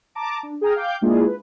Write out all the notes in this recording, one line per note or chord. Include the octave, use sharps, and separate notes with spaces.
A5 A#5 D6
D4
G#4 G5 G#5 A#5 D#6 F6
F5 G5 D6 G6
G#3 A#3 D4 E4 F4 G#4
B4